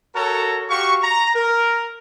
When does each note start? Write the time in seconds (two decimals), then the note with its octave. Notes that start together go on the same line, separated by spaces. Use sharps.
0.15 F#4 A4 A#4 C#5 A5 A#5
0.70 F#4 G4 F5 C#6
1.02 A#5
1.35 A#4